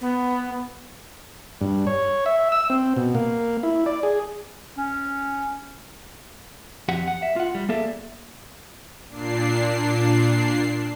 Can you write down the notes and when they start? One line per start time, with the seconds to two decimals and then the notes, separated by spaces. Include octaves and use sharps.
0.01 B3
1.61 G2
1.87 C#5
2.26 E5
2.52 E6
2.70 C4
2.96 B2
3.15 A#3
3.63 E4
3.86 D5
4.03 G#4
4.77 C#4
6.89 F2 G4 F#5
7.08 F#5
7.22 E5
7.36 F4 F#5
7.55 G3
7.69 A#3 G#4 A4 D5 E5
9.09 A#2 D4 C7